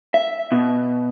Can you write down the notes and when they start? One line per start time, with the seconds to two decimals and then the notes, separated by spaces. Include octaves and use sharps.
0.14 E5
0.52 B2